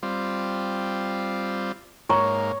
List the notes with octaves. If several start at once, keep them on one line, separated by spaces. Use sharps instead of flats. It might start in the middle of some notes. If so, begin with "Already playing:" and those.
G3 C4 F4
G#2 A#3 C#5 A#5